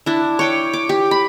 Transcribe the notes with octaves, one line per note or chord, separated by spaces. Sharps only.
D4 E4
C#5 G5 D6
D6
G4
B5